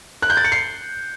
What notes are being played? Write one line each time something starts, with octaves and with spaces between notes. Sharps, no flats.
F#6
G6
A6
C#7
C7